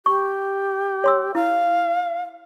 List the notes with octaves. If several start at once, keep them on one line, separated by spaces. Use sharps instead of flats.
G4 C#6
C#5 C6 E6
E4 F5